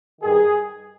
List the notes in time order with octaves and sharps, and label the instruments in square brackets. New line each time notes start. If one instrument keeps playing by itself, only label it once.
[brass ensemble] G2 D#3 G#4